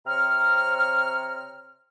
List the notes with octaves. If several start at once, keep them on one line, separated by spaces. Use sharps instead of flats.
C3 C4 C#5 A#5 F6